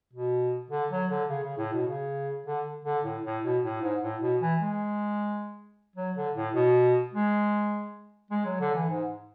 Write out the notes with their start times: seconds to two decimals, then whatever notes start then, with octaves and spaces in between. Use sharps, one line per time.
0.13 B2
0.71 D3
0.91 F#3
1.10 D3
1.30 C#3
1.43 C#3
1.58 A2
1.73 B2
1.88 C#3
2.47 D3
2.85 D3
3.04 A2
3.25 A2
3.44 B2
3.64 A2
3.82 G#2
4.03 A2
4.22 B2
4.41 E3
4.60 G#3
5.96 F#3
6.17 D3
6.36 A2
6.55 B2
7.14 G#3
8.31 G#3
8.45 F#3
8.60 D3
8.75 E3
8.89 G#2